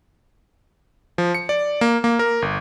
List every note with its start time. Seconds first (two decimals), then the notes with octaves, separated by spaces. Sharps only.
1.18 F3
1.34 C#7
1.49 D5
1.81 A#3
2.04 A#3
2.19 A#4
2.42 G1